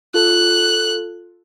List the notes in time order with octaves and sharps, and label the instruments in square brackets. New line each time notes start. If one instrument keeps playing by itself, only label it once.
[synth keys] F4 A4 [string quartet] F#6